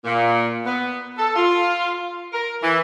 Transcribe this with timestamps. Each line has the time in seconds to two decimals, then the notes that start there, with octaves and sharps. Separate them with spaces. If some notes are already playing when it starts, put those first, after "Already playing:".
0.05 A#2
0.65 B3
1.18 A4
1.36 F4
2.33 A#4
2.62 E3